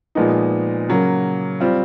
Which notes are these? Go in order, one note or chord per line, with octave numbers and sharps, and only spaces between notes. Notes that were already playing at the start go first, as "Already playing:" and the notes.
A#2 F3 G#3 B3 D#4
C#3 F#3 A#3
G3 C4 F4